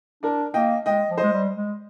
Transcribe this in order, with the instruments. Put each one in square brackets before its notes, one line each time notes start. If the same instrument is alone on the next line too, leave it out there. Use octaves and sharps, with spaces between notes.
[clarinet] D4 [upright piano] A#4 D5
[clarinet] A#3 [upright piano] D#5 G5
[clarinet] G#3 [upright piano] D#5 G5
[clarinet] F3
[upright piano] C5 D#5
[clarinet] G#3
G3
G#3